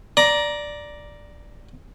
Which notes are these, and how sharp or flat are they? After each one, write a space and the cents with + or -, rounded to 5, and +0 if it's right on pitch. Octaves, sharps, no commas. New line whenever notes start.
D5 +0 A#5 +10